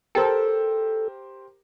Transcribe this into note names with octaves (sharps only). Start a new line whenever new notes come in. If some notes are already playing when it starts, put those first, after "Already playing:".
G4 A4 A#4 C5